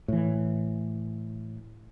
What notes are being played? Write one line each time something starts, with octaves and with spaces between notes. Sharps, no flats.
A2 E3